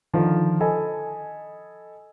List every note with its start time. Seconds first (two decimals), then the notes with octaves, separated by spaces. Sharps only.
0.13 D3 D#3 F3
0.60 A4 D#5 G#5 B5